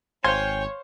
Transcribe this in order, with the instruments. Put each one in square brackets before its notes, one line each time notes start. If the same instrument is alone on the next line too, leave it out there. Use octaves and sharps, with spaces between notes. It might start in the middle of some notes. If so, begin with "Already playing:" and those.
[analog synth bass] G#1 [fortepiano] C5 F5 C6 [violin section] C#5 [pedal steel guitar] G5 G#5